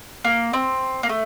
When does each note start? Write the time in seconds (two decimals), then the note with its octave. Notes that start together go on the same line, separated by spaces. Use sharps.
0.25 A#3
0.53 C4
1.03 A#3
1.09 A3